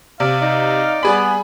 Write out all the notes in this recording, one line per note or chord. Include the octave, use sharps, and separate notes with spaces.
C3 D5 F5
D#4 D5
G3 B3 G#4 B5